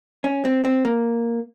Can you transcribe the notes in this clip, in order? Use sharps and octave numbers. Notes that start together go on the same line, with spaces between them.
C#4
C4
C4
A#3